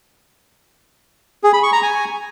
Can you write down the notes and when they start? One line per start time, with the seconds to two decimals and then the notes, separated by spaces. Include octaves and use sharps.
1.44 G#4
1.53 B5
1.63 C#6
1.73 A#5
1.82 G#5